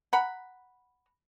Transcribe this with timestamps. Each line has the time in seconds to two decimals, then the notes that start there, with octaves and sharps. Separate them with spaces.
0.13 F#5 A#5 B5